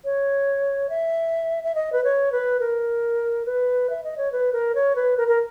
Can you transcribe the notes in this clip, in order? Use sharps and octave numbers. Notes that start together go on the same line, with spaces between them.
C#5
E5
E5
D#5
B4
C#5
B4
A#4
B4
E5
D#5
C#5
B4
A#4
C#5
B4
A#4
A#4